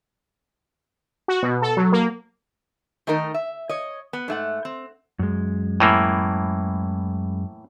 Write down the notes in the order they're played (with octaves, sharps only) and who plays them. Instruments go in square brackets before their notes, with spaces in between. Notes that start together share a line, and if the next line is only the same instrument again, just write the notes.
[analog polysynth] F#4
B2
A4
F#3
A#3
[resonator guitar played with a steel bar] D#3 A3 D#4 A#4 D#5
E5
C#5 D#5
B3
G#2 A3 F#5
C4
[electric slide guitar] F#2 G#3
[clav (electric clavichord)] A2 E3 A#3